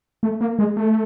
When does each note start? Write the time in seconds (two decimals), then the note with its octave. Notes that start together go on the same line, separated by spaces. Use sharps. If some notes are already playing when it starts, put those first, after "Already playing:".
0.23 A3
0.41 A#3
0.59 G#3
0.77 A3